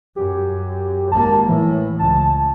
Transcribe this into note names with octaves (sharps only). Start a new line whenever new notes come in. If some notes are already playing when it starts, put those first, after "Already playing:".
F#2 G4
G#1 A#3 A5
A2 E3
C#2 A5